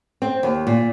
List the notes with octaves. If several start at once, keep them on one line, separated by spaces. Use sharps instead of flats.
C4
D#2
A#2